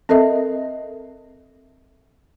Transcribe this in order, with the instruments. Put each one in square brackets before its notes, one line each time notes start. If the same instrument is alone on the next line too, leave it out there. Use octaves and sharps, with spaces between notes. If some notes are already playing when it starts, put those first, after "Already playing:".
[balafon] C4 A4 A#4 D#5 E5